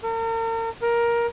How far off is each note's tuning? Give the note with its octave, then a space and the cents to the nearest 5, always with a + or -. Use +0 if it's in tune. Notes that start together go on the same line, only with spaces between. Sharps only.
A#4 -40
A#4 +15